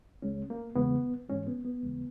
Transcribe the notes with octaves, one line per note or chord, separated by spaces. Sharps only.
C#2 C#3 G#3 C#4
A#3
E2 C#3 E3 G#3 B3
G#2 E3 G#3 C#4
B3
B3
D#2 C#3 E3 G#3